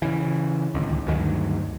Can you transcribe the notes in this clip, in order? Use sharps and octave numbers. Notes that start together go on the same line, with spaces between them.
C#3 E3
D1 C#2 D#3
D2 G2 D#3 F#3